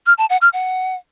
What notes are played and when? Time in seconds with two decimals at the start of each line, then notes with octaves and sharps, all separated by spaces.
0.06 F6
0.18 A5
0.30 F#5
0.41 F6
0.53 F#5